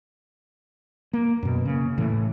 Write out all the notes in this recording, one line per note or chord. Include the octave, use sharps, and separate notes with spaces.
A#3
F#2 B2
C#3 A#3
A2 E3 A3